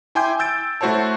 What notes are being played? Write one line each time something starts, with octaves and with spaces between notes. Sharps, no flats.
E4 G5 G#5 C6 D6 G6
E6 G6 A6 D7
A3 E4 F#4 C5 C#5 A5